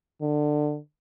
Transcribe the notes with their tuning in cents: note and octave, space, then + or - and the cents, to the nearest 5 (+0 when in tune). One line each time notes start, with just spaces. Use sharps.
D3 +20